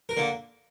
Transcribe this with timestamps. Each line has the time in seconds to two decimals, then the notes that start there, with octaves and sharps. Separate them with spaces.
0.09 A#4
0.17 D3 A#3